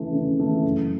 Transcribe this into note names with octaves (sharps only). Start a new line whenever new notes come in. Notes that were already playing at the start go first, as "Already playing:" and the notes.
Already playing: C#3 E3 A3
C#3
E3 A3
F#2